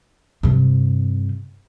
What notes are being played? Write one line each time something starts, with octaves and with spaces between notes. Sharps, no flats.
G2 C3